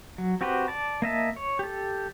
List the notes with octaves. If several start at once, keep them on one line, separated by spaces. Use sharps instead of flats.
F#3
C4 F#4 G4 B4 C5
D5 A5
A#3 D#5 E5 A5
C#5
G4 A4